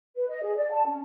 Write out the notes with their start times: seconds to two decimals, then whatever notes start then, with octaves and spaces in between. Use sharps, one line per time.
0.16 B4
0.29 D#5
0.43 G#4
0.57 D5
0.72 A5
0.86 C#4